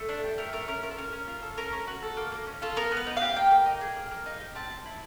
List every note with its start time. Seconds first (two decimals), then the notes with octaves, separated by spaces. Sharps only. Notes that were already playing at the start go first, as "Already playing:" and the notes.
Already playing: A3
0.09 D4
0.23 G4
0.38 A3 A#4
0.53 A3 A#4
0.68 C#4 A#4
0.83 F4 A#4
0.91 A4
0.98 C#4 A#4
1.13 C#4
1.27 F4
1.42 A4
1.58 C#4 A#4
1.73 C#4
1.88 F#4
2.02 A4
2.17 A#3
2.32 A#3
2.47 C#4
2.62 F4 A4
2.76 B3 A#4
2.92 B3
2.97 B4
3.07 D#4
3.17 G4 F5
3.36 A#3 G5
3.51 A#3
3.66 D#4
3.81 G#4
3.96 A#3
4.11 A#3
4.26 D#4
4.40 G4
4.55 C4 A5
4.70 C4
4.85 E4